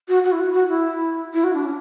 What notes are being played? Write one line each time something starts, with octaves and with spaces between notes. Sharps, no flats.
F#4
F#4
E4
F#4
F#4
E4
E4
F#4
D4
C#4